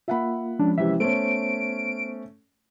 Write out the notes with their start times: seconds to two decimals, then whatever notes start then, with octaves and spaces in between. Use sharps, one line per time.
0.08 A#3 F4 E5 F#5 B5
0.59 F3 G#3 C#4 D4
0.78 C3 E3 E5
1.00 A3 B3 C#4 C5 D7